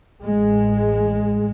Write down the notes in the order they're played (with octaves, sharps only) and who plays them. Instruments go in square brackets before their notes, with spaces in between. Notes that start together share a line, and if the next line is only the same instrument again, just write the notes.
[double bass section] A1 G#3